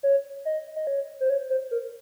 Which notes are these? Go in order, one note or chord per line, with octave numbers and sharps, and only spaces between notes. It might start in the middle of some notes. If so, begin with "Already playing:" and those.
C#5
D#5
D#5
C#5
C5
C#5
C5
A#4